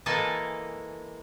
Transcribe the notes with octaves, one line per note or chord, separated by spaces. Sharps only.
E3 G#3 A#3 A4 G#5 A5